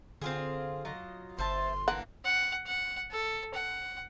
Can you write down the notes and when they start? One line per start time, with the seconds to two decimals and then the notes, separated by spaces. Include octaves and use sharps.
0.22 D3 C4 F4 G#4
0.85 F#3 F4 D#5
1.39 G1 C5 E5 A5 C6
1.88 E3 A#3 D4 F#5
2.25 F#5
2.67 F#5
3.11 A4
3.54 F#5